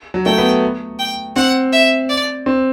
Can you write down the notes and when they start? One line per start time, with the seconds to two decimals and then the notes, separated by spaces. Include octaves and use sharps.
0.14 F#3
0.25 A3 G5
0.38 B3
0.99 G5
1.36 C4 F#5
1.72 E5
2.09 D5
2.46 C4